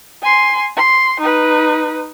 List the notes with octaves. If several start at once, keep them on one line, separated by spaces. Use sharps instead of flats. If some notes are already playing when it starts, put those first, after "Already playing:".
G#5 C6
C6
D#4 B4